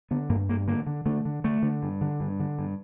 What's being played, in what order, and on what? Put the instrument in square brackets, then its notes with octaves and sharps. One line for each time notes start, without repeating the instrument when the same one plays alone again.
[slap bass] D3 B3
G2 A#3
G2 A#3
D3 A#3
D3
D3 A3
D3
D3 A3
D3
G2
D3
G2
D3
G2